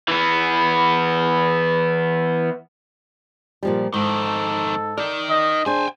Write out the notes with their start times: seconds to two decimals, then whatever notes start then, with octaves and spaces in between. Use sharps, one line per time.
0.08 E3 B3
3.63 A#2 F3 G3
3.94 F2 G#2 D#3 A4
4.98 D#4 A#4 D5
5.29 D#5
5.66 D4 G#4 C5 G5 G#5